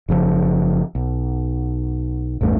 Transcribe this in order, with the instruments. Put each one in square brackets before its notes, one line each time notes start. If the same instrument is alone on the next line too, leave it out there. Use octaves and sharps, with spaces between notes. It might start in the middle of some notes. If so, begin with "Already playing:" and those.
[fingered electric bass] F#1 C#3 F3
B1
A1 E2 G2 A3